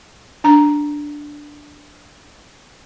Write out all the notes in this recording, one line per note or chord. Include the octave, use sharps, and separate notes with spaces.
D4 A#5